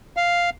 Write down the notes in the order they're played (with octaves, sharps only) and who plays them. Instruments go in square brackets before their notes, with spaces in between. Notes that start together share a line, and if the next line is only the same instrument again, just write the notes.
[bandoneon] F5